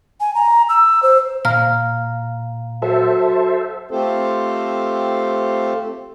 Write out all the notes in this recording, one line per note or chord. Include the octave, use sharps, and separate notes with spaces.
G#5
A#5
E6
C5
A#2 F5 A#5 F6
F#3 A4 C5 E5
A3 C4 F4 G4 A4 C5